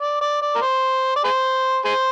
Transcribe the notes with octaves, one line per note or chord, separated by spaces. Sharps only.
D5
D5
D5
A#4
C5
D5
G#4 C5
G#4 C5